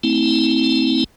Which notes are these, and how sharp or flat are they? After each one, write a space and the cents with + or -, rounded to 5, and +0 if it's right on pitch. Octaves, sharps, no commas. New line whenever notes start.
A3 +25 C4 +0 E4 -30